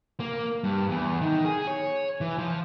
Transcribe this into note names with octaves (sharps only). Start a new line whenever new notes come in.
A#3
G2
E2
D#3
G#4
C#5
E3
F3